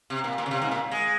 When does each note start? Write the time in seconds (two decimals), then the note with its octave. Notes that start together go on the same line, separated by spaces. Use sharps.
0.10 C3
0.24 A#2
0.38 A#2
0.46 C#3
0.51 C3
0.62 G#2
0.71 A#2
0.91 G#3